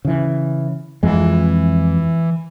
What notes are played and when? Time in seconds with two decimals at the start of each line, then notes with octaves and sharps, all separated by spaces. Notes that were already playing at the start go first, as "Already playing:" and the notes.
0.05 C#3 E3
1.03 F2 E3 G#3